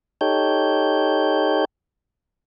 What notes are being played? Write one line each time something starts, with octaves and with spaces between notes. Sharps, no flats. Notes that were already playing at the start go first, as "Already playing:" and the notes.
D#4 G4 A4 C#5 G6